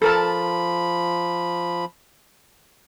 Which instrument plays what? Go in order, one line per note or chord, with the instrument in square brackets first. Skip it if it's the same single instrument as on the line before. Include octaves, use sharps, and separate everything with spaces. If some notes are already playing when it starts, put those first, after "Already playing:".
[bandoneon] F3 B5 [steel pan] A4 A#4 A5